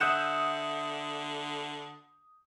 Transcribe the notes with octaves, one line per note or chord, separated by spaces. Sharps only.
D3 E5 F#5 D#6 G6 E7